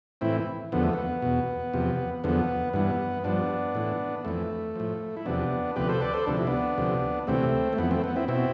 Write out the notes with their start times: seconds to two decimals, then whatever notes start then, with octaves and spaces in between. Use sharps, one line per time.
0.21 A2 E3 C4 E4
0.72 E2 D3 F3 B3
0.83 A3
0.93 B3
1.22 E2 B2
1.74 E2 C3 F3
2.24 E2 D3 F3 B3
2.73 G2 E3 B3
3.24 G2 F3 B3 D4
3.75 A2 E3
4.25 F2 E3 A3
4.76 A2 F3
5.17 E4
5.26 E2 C3 F3 B3 D4
5.76 D2 C3 F3 G4 B4
5.89 A4 C5
6.01 B4 D5
6.14 A4 C5
6.26 D2 C3 F3 D4
6.37 E4
6.47 B3 D4
6.78 D2 C3 F3
7.27 D2 C3 E3 A3 C4
7.73 A3
7.78 F2 E3 B3
7.91 A3 C4
8.04 B3
8.16 C4 E4
8.28 B2 C4 E4